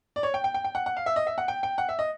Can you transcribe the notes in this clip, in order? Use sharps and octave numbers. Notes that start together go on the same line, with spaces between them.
D5
C#5
G5
G5
G5
G5
F#5
F#5
F5
E5
D#5
E5
F#5
G5
G5
F#5
E5
D#5